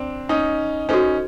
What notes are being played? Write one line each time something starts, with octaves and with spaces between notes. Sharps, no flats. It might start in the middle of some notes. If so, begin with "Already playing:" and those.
Already playing: C4 D4
C#4 D#4
C#4 D#4 F#4 A4 C5